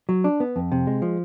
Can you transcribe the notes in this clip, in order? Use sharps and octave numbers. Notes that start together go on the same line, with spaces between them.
F#3
D4
B3
F2
C3
G#3
F3